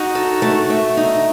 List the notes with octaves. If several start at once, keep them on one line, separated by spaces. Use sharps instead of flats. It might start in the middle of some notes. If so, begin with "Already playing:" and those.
Already playing: D#4 F#4
A4
A3
A3
D#4